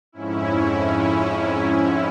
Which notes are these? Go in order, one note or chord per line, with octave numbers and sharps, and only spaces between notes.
F2 G#2 C#4 E4